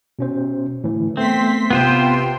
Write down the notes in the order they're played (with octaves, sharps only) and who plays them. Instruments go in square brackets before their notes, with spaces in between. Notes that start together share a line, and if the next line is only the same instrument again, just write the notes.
[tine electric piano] B2 C#4 C5
A2 D3 E3
[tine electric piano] A3 B3 [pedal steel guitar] C4 [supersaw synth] C6 B6
[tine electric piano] A1 [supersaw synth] C3 G5 C6 [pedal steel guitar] B3 F4 C5